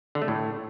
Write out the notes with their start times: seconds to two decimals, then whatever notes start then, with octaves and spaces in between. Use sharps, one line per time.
0.15 D3
0.22 A3
0.28 A2